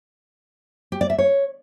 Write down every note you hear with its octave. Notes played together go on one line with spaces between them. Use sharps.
G4
D5
E5
C#5